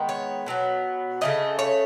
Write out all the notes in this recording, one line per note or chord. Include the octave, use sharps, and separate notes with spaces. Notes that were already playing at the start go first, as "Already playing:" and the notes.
Already playing: D#3 G#3 B3
C#5
B2 F#3 B3
C#3 F#3 A3 D#5
C#5